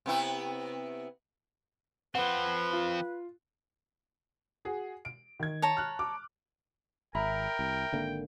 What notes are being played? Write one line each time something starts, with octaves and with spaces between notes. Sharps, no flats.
C3 B3 E4
F3 C4 B4 F#5
F4
F#4 G#4
D7
D#3 G#6
C#5 A5 A#5
F6 F#6
D6
G#1 A#4 E5 G5 A#5 B5
C2
G#1 D3 A#3